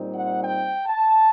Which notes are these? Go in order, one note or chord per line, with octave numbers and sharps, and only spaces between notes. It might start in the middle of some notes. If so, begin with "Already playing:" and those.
Already playing: A#2 G3 C4 D#4
F#5
G5
A5